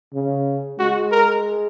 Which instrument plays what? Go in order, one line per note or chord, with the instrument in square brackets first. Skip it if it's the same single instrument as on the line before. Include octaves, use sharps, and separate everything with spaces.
[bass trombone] C#3
[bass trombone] G#3 [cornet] F#4
[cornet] A#4